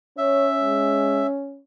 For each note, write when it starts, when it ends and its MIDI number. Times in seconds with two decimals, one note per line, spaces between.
0.18 1.61 61
0.18 0.51 73
0.18 1.27 76
0.61 1.23 56